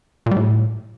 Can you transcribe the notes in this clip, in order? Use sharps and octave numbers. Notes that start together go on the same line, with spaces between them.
A#2
G3
A2